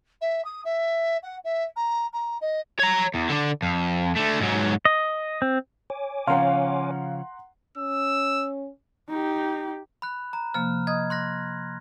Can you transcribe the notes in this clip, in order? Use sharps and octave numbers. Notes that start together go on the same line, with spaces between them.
E5
D#6
E5
F#5
E5
A#5
A#5
D#5
C#5 A#5
E2
D3 D4
F2
D3 A3
G#2 F#3
D#5
C4
C#5 G#5 D6
C#3 F3 C#4 F5 F#5 A#5 C6
C#4 E6
D#4 G4
B5 F#6
A#5
C3 F3 A#3 F6
D#5 D#6 G#6
C6 F#6 A#6